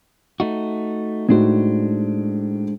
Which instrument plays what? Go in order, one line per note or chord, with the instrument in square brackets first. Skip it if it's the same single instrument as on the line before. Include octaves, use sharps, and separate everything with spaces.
[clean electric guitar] A3 D#4 F#4
[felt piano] A2 D#4 F#4 [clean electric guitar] G#3 D4 C5